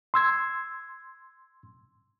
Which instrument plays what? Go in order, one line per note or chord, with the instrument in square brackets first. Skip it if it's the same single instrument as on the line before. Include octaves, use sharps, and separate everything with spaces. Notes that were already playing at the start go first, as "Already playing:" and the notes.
[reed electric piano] C6 E6 G#6